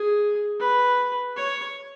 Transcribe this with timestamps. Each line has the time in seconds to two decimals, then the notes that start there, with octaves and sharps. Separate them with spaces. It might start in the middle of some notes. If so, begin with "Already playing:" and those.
Already playing: G#4
0.60 B4
1.36 C#5